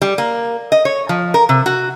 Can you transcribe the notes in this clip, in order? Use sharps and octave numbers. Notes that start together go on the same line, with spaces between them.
G3
A#3
D#5
C#5
F3
A#4
C3
F#4